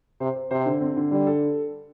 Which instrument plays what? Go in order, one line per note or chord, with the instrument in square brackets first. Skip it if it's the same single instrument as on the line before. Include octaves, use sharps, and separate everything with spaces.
[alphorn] C3 [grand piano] C5
[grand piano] C5
[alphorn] C3 [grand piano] C5
[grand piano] D3
C4
D3
[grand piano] D3 [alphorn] G3
[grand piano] A4